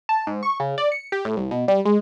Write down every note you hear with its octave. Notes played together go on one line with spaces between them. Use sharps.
A5
G#2
C#6
C#3
D5
C#7
G4
A2
C2
B2
G3
G#3